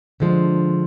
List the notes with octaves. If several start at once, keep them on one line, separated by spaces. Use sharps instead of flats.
D3 F3 G#3 D4